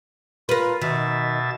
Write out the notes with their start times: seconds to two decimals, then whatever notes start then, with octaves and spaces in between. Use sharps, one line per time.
0.49 F4 A#4 B4
0.81 B2 D#3 E5 A6